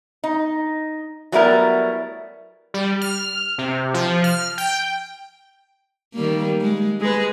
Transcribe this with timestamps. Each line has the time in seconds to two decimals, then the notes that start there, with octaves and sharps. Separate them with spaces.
0.24 D#4
1.32 F#3 G3 A3 B3 E4 A#4
2.74 G3
3.01 F6
3.58 C3
3.94 F3
4.24 F6
4.58 G5
6.14 D#3 G3 A#3
6.61 G#3
7.01 G#3 G#4 B4